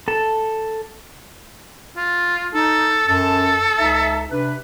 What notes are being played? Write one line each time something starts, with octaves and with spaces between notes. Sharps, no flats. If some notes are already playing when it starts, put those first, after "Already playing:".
A4 A5
F4
D#4 A4
F#2 A4 A5
C#2 D#4 E5
C3 D4 B4